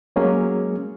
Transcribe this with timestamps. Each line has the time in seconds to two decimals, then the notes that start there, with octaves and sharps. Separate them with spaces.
0.16 F#3 G#3 A#3 C#4 G#4